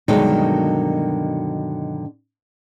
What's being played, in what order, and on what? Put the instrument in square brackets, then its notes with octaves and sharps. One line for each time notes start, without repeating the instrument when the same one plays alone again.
[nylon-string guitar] G2 B2 D3 D#3 F#3 G#3